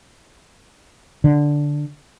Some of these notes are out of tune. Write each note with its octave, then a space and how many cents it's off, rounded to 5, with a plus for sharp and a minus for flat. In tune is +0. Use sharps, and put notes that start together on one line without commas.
D3 -5